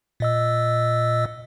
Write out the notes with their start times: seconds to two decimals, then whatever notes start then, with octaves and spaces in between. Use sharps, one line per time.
0.20 A#2 D#5 E6